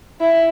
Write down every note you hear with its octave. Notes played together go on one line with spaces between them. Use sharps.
E4